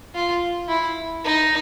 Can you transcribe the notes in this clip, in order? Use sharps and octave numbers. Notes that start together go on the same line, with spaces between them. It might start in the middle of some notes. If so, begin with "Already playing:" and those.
F4
E4
D#4